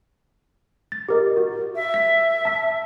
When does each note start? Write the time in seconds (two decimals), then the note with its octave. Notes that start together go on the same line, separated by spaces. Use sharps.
0.92 A6
1.09 G4 A#4 D#5
1.37 F#4
1.76 E5
1.94 B6
2.45 A5 E6